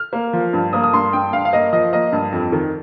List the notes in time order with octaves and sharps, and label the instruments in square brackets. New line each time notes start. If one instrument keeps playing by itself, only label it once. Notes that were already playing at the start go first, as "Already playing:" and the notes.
Already playing: [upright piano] F6
A#3
F3
G2
A#3 D#6
D#6
G2 C6
G2 G5
G2 F5
F5
A#3 D#5
F3 D#5
A#3 D#5
G2
F2
D#3